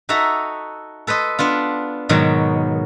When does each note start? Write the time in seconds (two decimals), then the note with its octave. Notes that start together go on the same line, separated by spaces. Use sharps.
0.09 D#4 F#4 A4 D#5 E5 A#5
1.07 A4 B4 C5 D#5
1.39 B3 D4 F4
2.09 G#2 B2 D#3 F#3